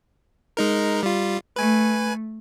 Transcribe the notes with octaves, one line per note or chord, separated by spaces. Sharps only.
G#3 D#4 A#4
G3 F4
A3 B4 G#5